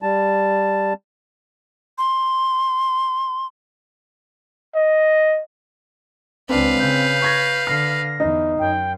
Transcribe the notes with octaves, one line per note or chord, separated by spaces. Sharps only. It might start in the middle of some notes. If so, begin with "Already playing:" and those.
G3 A5
C6
D#5
C#2 C4 D4 B4 F5
C#3 G6
C#6 G#6 A#6
D3 F6 A#6 C7
E2 D#4
F#2 G5